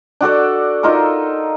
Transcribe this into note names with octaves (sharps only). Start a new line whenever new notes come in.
D4 F#4 A4 D5
D#4 F4 A4 A#4